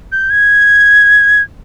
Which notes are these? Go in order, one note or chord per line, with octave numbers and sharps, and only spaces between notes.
G6
G#6